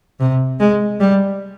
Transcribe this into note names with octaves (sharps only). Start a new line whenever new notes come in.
C3
G#3
G3